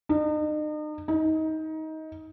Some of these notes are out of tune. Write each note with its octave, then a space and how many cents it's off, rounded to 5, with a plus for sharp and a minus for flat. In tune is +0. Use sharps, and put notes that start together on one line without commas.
D#4 -40
D#4 +20